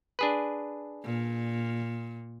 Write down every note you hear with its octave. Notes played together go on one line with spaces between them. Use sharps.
D4 G#4 B4
A#2